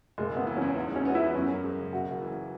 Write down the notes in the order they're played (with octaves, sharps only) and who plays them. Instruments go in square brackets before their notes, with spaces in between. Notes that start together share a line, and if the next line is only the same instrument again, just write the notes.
[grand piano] F#1 [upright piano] G#3
[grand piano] F#1 [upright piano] B3
[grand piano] E3
[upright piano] C#4
[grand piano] E2
[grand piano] G#2 [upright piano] B3
[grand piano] G#2 [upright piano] C#4
[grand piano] B3 [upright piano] F#4
[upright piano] E4
[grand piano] E3
[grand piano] F#2 [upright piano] C#4
[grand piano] F#2
G#3
C#3
[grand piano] F#1 [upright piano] F#4
[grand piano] F#1
E3